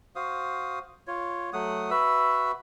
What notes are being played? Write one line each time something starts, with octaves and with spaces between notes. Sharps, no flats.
F#4 C5 F5 D#6
F4 C#5
F#3 A3 F#5 D#6
F#4 B4 E5 E6